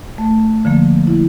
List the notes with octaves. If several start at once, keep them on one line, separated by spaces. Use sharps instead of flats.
A3
D3 F3 A#3
E4